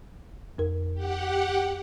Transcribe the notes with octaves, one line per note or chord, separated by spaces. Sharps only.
F2 A#4
G4 F#5